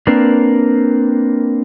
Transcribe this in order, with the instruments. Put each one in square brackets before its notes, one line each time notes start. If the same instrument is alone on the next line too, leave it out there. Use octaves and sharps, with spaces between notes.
[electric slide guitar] A#3 C4 D4 A#4 B4